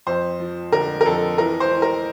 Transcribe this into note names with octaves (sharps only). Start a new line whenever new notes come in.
F2 C5
F3
D3 A#4
A#4
F2 A4
E3 A#4
C5
E3
A#4